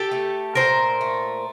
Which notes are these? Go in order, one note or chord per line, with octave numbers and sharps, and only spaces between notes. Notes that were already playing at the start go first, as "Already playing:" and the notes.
Already playing: G4 A4
A3
A#2 A#4 C5
A3